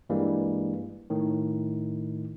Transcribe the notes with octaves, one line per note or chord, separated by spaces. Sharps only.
G2 E3 G3 G#3 A#3
A2 D#3